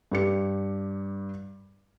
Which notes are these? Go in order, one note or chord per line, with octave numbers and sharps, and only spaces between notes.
G2 G4 C#7